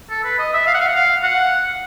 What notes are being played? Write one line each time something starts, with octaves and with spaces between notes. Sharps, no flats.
A4
B4
D#5
E5
F5
F#5
F5
F#5
F5
F#5